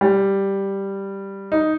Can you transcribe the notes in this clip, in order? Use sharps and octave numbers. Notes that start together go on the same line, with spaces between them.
G3
D#4